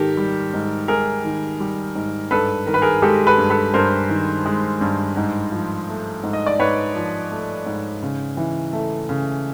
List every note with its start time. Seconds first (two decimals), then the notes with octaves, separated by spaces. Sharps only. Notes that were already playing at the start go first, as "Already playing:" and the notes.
Already playing: G#2 D#3 G4 A4 A#4
0.17 G3
0.54 G#2
0.88 G#2 G#4 A#4
1.25 D#3
1.60 G3
1.95 G#2
2.31 G2 A4 B4
2.67 D#3 A#4
2.74 B4
2.82 G#4 A#4
3.02 G#3 G4 A4
3.27 A4 B4
3.38 G2
3.50 A4 B4
3.74 G2 A#4 C5
4.10 D#3
4.46 G#3
4.81 G2
5.17 G#2
5.52 F3
5.88 A3
6.23 G#2
6.33 D#5
6.46 D5
6.59 G#2 B4 C#5
6.95 F3
7.31 A3
7.66 G#2
8.02 C#3
8.37 E3
8.73 A3
9.09 C#3